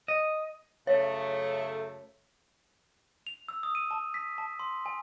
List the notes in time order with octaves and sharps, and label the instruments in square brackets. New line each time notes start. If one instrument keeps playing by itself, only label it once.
[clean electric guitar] D#5
[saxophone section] F#2 C#3 A3 [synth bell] C#5
[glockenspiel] F7
E6
D#6
D#7
A5
B6
A5
C6
G#5